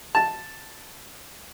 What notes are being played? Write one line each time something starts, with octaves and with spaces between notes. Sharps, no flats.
A5